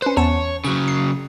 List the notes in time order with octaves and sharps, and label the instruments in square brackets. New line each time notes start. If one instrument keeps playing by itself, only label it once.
[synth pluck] C#4 B4 [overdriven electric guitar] C5
[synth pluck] E2 C#4 A5 [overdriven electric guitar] C#5
[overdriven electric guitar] C#3 F#3 [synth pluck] C#6
[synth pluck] C7